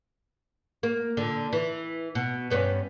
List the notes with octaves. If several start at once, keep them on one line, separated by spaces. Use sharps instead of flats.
A#3
A#2 D3
E3
B2
G2 B3 C#4